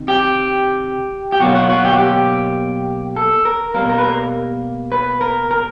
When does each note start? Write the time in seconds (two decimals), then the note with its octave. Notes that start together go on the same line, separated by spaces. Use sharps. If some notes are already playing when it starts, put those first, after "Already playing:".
Already playing: C3 D#3
0.08 G4
1.32 G4
1.40 B2 F#3 A#3 F#4
1.55 F#4
1.70 F#4
1.85 G4
1.93 F#4
1.98 G4
3.16 A4
3.45 A#4
3.74 B2 G3 A#3 A#4
3.90 A#4
3.98 B4
4.04 A#4
4.92 B4
5.21 A#4
5.51 A#4